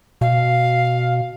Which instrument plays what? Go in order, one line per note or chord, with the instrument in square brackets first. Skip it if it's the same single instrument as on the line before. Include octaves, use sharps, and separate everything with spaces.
[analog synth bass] B2 [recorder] F5